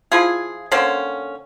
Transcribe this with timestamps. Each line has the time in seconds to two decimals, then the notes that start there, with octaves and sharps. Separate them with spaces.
0.12 F3 E4 F4 G#4
0.72 D3 A#3 C4 C#4